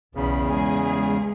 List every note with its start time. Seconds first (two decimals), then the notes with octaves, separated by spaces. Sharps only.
0.15 B1 E2 C#3 B5
0.49 G#3 G#4